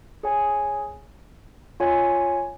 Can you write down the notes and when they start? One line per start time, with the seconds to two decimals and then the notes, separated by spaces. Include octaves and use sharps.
0.23 G#4 C#5 G#5
1.80 F4 C#5 G#5